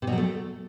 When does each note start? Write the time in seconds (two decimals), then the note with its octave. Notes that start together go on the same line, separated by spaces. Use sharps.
0.02 C3
0.07 B2
0.12 F#3
0.18 A3